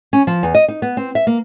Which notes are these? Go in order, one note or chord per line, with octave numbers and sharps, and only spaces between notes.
C#4
F3
E2
D#5
D#4
B3
C4
E5
A#3